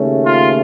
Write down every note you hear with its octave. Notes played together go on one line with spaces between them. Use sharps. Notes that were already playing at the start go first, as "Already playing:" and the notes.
Already playing: D#2 C#3 A3 C#4
F4